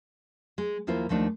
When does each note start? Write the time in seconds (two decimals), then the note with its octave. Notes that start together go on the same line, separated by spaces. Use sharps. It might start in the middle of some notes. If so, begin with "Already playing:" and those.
0.58 G#3
0.87 D#2 F3 A#3 E4 F4 C5
1.09 D#2 F3 A3 D4 D#4